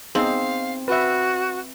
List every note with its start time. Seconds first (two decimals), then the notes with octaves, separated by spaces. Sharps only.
0.15 B3 C4 D#4 G#4 F5
0.88 F#4 B4 E5